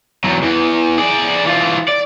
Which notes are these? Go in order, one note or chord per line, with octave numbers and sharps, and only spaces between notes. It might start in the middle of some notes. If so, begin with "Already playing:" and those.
E2 F#3
E2 E3
G#4 D5
E3 F4
D5